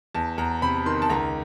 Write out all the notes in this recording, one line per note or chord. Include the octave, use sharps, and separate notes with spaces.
E2 A5
E2 A#5
C3 B5
D#3 C6
A5
C#2 A#5